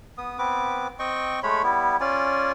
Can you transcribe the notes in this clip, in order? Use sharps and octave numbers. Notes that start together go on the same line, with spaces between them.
B3 D#6
B3 C4 B4 D6
C4 D#5 G5 C#6
G#3 A3 C#5 B5
G3 B3 E4
C#4 F4 D5 G#5